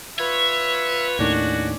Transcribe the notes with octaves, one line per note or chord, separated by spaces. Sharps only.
F4 B4 C#5 E5
D#2 A2 D#3 C#4 D4 F#4